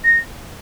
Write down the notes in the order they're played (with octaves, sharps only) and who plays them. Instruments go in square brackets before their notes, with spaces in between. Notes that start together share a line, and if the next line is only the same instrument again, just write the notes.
[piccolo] A#6